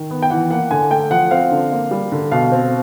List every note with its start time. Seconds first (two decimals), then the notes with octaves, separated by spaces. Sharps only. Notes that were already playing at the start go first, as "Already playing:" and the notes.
Already playing: D#3
0.11 B3
0.22 G5
0.30 E3 F#5
0.50 A#3 F#5
0.71 D3 G#5
0.91 A3 G5
1.11 F3 F#5
1.31 C4 F5
1.51 D3
1.72 A#3
1.91 G3
2.12 D3
2.32 B2 F5
2.52 C4